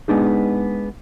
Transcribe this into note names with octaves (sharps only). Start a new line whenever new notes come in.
G#3 B3 D4 D#4 G#4